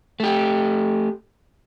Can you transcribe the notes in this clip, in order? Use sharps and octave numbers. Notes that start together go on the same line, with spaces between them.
A3 G4